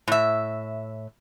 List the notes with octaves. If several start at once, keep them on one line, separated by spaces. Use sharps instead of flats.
A2 E5